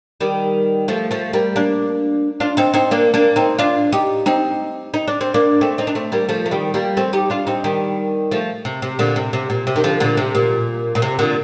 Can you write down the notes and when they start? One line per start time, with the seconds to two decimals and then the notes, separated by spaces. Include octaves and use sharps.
0.21 D#3 G3
0.88 F3 A3
1.11 F3 A3
1.33 G3 A#3
1.56 A#3 D4
2.40 D4 F4
2.57 C4 D#4
2.74 C4 D#4
2.91 A#3 D4
3.14 A#3 D4
3.36 C4 D#4
3.58 D4 F4
3.92 D#4 G4
4.26 C4 D#4
4.94 D#4
5.08 D4
5.21 C4
5.34 A#3 D4
5.61 A3 C4
5.78 C4 D#4
5.87 D4
5.95 A3 C4
6.12 G3 A#3
6.29 F3 A3
6.46 A3
6.51 D#3 G3
6.74 G3 A#3
6.97 A3 C4
7.13 D#4 G4
7.30 D4 F4
7.47 C4 D#4
7.64 D#3 G3
8.31 F3 A3
8.65 C3
8.82 C3
8.99 A#2 D3
9.16 C3
9.33 C3
9.50 A#2
9.67 C3
9.76 D#3
9.84 D3 F3
10.00 A#2 D3
10.17 C3
10.35 A#2
10.95 A#2
11.02 C3
11.19 A#2 D3